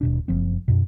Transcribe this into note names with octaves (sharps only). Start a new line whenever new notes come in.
D#1 B2 D4
F#1 F3 C4
F#2 B2